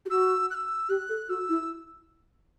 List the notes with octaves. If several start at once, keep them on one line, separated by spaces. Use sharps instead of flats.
G4
F#4 E6
F#6
E6
G4 F#6
A4
F#4 E6
E4